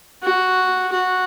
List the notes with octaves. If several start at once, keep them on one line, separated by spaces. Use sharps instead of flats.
F#4
F#4